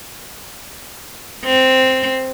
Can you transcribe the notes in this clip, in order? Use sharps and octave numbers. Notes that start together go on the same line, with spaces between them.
C4